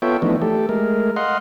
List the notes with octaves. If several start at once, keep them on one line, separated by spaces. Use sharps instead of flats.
B3 F4 A4 C#5 E5 G5
E3 F3 A3 B3 D4 D#4
A3 G4 A4
G#3 A3 A#4
D#5 F5 F#5 C6